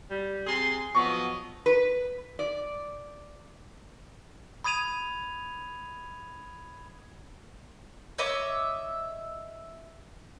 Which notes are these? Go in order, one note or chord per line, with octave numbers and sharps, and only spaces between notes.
G3
C3 G#4 G#5 C6
F3 F#3 B3 D#5 C#6
B4
D5
B5 D#6 G#6 D#7 F7
C#5 D#5 E5 D6